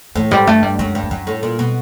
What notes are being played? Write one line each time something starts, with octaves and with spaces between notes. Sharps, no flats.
A2 E3
G#2 G3
G2 A3
G3
F#2 G#3
G2
G#3
F#2 G3
A2
A#2
B2